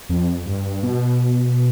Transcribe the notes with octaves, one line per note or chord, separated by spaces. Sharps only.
F2
G2
B2